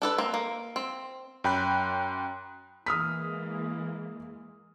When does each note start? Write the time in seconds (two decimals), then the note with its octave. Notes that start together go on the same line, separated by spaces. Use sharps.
0.02 D4 A4 B4
0.18 A#3 C4
0.34 A#3
0.76 C4
1.44 F#2 G5 B5 F#6
2.86 E3 G#3 A#3 D#6 F6 B6